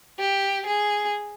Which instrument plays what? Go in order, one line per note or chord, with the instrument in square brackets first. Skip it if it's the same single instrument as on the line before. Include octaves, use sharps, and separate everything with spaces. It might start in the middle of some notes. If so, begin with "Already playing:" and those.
[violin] G4
G#4